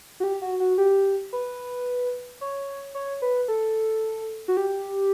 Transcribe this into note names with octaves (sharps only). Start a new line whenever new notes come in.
F#4
G4
F#4
F#4
G4
B4
C#5
C#5
B4
A4
F#4
G4